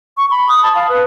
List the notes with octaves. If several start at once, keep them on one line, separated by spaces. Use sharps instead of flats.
C#6
B5
D#6
A5
F5
B4